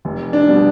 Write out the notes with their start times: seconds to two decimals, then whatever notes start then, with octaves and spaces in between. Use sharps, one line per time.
0.05 F1
0.33 D4
0.48 B2 G3